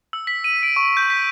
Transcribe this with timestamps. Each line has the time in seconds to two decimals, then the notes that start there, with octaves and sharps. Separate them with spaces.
0.13 E6
0.27 B6
0.44 D#7
0.63 D7
0.76 C#6
0.97 G6
1.10 B6